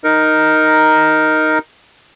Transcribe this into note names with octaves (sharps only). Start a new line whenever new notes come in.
D#4 A#4